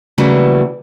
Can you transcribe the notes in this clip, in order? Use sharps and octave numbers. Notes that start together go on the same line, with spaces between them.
C#3 E3 F#3 G3 A3 A#3